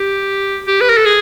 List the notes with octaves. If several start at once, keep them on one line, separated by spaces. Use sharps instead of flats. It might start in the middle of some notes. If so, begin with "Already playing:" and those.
Already playing: G4
G4
B4
A#4
A4
G#4